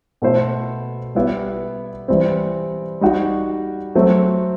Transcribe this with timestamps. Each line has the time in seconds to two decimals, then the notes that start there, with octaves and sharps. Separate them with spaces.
0.22 B2 A3 E4 A4 C5
1.15 G3 B3 E4 G4
2.08 E3 G3 C4
3.01 G3 D#4 F#4
3.95 F#3 A3 C4